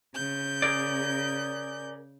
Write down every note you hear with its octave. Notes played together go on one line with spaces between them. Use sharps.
C#3 G6
G#4 A#4 D5